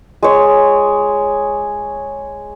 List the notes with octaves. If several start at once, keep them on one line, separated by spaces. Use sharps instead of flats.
G#3 C#5